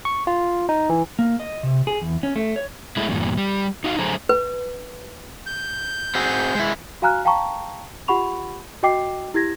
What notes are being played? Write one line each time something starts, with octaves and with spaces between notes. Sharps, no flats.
C#6
F4
D#4
E3
A#3
D#5
C3
G#4
E2
C#4
A3
C#5
G#3 A3 E4
E2 G2 A#2
G3
D#4 F#4 F5
D3 F#3 A3 G#4 C5 A#5
B4
G6
C4 F#4 G#4
G#3 E4
F#4 F5 G#5 A#5 F6 F#6
F5 G5 A5 A#5 C#6
F4 G4 F#5 B5 C#6 F7
F#4 D#5 G5 D6 C7
E4 G4 G#6 A#6